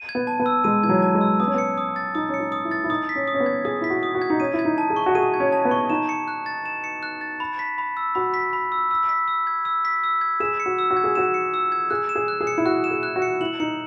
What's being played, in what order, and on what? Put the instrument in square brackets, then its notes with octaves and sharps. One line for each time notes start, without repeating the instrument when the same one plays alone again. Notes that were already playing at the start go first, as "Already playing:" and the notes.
Already playing: [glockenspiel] D#7
G#6
[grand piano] B3
[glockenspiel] A5
[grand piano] B3
[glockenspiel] E6
[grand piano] G#3 [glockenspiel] D#7
[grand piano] E3 [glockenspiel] G#6
[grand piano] F#3
[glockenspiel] A5
[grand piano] G#3
[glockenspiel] E6
[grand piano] B3 [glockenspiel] D#6
[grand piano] C#4
[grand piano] B3 [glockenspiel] C#7
[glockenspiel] D#6
A6
[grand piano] D#4 [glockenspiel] D#6
[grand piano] C#4 [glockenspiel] C#7
[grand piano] D#4
[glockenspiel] D#6
[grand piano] E4
[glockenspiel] A6
[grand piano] E4
[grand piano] D#4 [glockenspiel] D#6
[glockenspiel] B6
[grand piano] C#4
[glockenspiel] D#6
[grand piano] C#4
B3
[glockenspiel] G#6
[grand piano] G#4 [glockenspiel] D#6
[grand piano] E4 [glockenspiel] B6
[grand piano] F#4
[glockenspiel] D#6
[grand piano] F#4
[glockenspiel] G#6
[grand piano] D#4
[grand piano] C#4 [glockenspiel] D#7
[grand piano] E4
[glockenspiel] G#6
[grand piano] D#4
[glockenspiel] A5
[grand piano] G#4
[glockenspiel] C#6
[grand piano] F#4
[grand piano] G#4 [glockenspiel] D#7
[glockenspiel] G#6
[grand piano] C#4
[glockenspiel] A5
[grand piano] B3
[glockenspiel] C#6
[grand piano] D#4 [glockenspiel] E7
[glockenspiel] C#7
F#6
A6
E7
C#7
F#6
A6
B5
B6
B5
E6
[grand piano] F#4 [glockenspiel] B5
[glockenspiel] B6
B5
E6
E6
B6
E6
G#6
E6
B6
E6
G#6
[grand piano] G#4 [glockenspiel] E7
[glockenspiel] C#7
[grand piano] F#4
[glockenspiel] E6
[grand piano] F#4
[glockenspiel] G#6
[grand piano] G#4
[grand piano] F#4 [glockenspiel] E7
[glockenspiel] C#7
E6
G#6
[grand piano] G#4 [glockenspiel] F#6
[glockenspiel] E7
[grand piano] G#4
[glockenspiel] F#6
[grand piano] G#4
[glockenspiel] C#7
[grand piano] E4
[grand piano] F#4 [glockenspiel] F#6
[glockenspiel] E7
[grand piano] G#4
[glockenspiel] F#6
[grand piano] F#4
[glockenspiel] C#7
[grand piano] E4 [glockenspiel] F#7
[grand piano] D#4 [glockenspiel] C#7